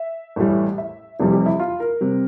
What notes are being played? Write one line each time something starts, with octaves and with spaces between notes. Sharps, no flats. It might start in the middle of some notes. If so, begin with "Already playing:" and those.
Already playing: E5
A1 A2 E3 G3
E5
F1 F2 E3 G3
G4
E4
F4
A#4
C3 G3